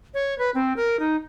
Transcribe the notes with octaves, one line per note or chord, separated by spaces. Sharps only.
C#5
B4
C4
A#4
D#4